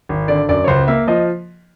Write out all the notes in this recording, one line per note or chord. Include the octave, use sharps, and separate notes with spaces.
G#1
D3 D5
F#2 D5
C#5
C#2 C5
A#3 E5
F3 D#5